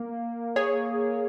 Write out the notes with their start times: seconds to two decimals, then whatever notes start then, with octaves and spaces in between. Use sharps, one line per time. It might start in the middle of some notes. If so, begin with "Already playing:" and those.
Already playing: A#3
0.56 G#4 C#5